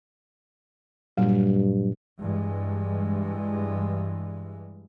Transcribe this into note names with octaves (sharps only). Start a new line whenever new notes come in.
G2 A#2 F#3 G3
G2 E3 G#3